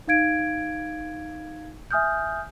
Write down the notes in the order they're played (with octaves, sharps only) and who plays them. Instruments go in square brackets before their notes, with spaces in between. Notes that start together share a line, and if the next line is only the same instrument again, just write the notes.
[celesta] D#4 F5 G#6 D7
E5 G#5 D#6 F6 G6